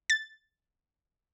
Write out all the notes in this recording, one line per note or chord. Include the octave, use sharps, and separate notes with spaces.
A6